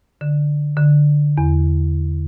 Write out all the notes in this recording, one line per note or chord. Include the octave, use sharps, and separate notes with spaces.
D3
D3
E2